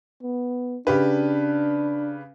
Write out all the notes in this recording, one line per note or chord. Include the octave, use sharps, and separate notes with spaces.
B3
C#3 D4 G4 B4